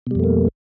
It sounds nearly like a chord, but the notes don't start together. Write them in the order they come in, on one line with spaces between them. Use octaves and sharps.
B2 G3 F2 A3 A#3